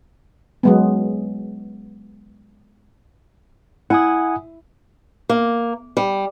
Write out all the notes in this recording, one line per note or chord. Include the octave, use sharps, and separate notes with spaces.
F#3 G#3 B3
E4 F#5 G#5 D#6
A#3
G3